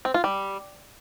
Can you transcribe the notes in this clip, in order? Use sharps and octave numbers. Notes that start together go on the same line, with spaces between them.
C4
F4
G3